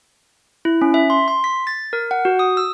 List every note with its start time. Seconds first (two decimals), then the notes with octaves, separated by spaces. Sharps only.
0.65 E4
0.82 C#4
0.94 E5
1.10 C6
1.28 C6
1.44 B6
1.67 A6
1.93 A#4
2.11 F#5
2.25 F#4
2.39 D#6
2.57 E6